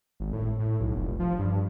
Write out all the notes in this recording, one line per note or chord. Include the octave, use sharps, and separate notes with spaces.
G#1
A2
A2
B1
F1
F3
G2